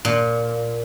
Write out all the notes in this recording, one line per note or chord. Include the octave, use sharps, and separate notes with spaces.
A#2